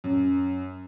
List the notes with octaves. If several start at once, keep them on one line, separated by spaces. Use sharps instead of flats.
F#2